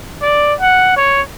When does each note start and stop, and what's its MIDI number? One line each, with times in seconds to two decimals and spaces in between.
0.22 0.53 74
0.60 0.92 78
0.96 1.22 73